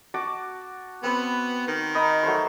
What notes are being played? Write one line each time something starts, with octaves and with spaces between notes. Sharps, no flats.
F#4 A5 D6
B3 C4 B4
D#3
D#4 B5 D#6
F#3 A3 C5